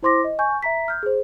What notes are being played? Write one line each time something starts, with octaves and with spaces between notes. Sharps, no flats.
E4 C5 C6 D6 A#6
D#5
G#5 C#6 G6
E5 A#5 B6
F6 G6
G#4 C5